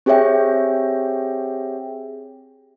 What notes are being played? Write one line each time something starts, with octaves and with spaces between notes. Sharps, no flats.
C4 G4 G#4 C#5 E5 G5